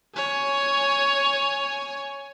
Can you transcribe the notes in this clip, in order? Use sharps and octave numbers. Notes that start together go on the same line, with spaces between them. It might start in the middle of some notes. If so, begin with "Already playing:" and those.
C#5 G#5